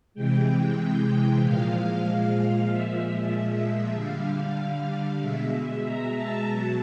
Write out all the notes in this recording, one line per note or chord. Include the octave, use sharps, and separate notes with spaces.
C3 E3 G#3 G5
A#2 F3 G#3 F5
A#2 F3 G#3 E5
D3 G3 F5
B2 G#3 E5
A#5
A5
B2 F#3